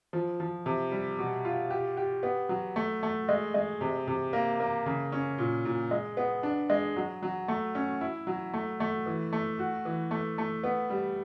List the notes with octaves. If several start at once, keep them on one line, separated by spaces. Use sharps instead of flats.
F3
F3
C3
G3
B2
F4
G4
G4
B3
F#3
A3
A3
G#3
G#3
C3
C3
A#3
A#3
C#3
C#4
A#2
A#2
G#3
B3
D4
G#3
F#3
F#3
A3
C#4
E4
F#3
A3
A3
E3
A3
F#4
E3
A3
A3
B3
G3